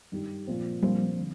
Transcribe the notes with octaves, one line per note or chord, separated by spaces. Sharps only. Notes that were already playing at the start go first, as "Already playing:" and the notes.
G2 D#3 G3
A#2 F3 C4
A#1 A#2 F3 G3 A#3 C4 F4
D3